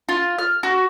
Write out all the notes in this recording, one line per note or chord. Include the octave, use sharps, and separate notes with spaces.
F4
F6
F#4